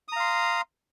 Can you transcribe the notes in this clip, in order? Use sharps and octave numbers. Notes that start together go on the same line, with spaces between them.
F5 A#5 C6 D#6